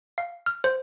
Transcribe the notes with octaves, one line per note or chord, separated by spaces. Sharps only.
F5
F6
C5